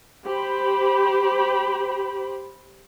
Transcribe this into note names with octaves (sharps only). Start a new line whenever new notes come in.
G4 C5 B5